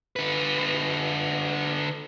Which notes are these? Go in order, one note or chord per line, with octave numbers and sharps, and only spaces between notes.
D3 B4